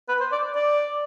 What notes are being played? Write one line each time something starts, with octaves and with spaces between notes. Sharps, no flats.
B4
C5
D5
D5